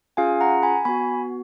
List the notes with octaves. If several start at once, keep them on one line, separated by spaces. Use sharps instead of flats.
C#4 F4 G#4 F5 G#5
F#5 A#5
G#5 B5
B3 F#4 G#5 B5